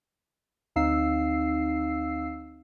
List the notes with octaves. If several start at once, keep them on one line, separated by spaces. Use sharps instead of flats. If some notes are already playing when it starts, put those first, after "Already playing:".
D2 C4 D#4 F5 E6 C7